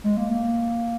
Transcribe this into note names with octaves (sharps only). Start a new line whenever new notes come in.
G#3
A#3
A#3